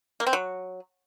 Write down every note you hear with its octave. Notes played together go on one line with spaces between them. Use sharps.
A#3
C4
F#3